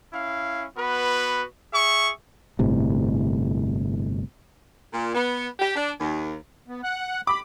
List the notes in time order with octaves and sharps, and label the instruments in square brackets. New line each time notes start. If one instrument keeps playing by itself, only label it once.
[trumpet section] C#4 E4 F5
B3 F#4 B4
G#4 E5 C#6
[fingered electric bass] G1 A2 C3
[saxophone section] A#2
B3
G4
D4
D#2
[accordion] B3
F#5 F#6
[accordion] B5 [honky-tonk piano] D6